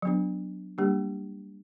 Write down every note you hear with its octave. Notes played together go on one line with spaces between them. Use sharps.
F#3 B3 D4
G3 A#3 D4 G4